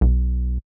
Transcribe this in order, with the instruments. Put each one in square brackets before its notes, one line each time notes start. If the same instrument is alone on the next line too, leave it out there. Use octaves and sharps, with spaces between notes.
[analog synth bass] B1